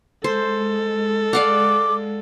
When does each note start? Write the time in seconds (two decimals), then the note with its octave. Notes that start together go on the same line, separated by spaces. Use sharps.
0.24 G#3 A4 C5
1.33 D5 F5 F#5 D6